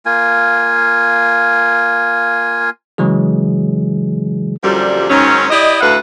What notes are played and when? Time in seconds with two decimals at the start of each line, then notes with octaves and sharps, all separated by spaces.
0.06 A#3 F4 G#5
2.98 C#3 E3 F#3 G#3 G#4
4.62 F#2 A#2 D3 F3 G3
5.09 G#2 D#3 F#3 C#4
5.50 E4 G4 D5 D#5
5.81 D2 A2 A3 B4 F5 F#5